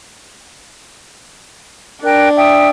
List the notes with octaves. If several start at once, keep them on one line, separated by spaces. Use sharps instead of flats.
D4 A#4 G5 F#6
E5 G5 D#6